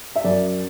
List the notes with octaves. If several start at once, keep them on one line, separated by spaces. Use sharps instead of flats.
E5
F#2 D5